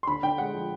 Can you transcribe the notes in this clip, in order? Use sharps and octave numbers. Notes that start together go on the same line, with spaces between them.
C6
D3 B5
D3 G5
G#3 F#5
F3